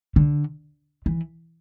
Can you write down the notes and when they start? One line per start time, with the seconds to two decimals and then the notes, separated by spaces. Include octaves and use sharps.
0.16 D3
1.06 E3